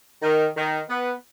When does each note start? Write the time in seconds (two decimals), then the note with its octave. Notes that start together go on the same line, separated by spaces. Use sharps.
0.22 D#3
0.56 D#3
0.88 B3